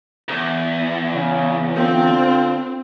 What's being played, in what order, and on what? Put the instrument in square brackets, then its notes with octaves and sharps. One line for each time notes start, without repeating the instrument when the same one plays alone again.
[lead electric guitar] B1 E2
[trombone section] C#3
[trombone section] D3 F4 [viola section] C4